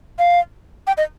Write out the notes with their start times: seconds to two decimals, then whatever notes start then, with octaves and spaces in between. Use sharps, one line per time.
0.19 F5
0.87 G5
0.98 D#5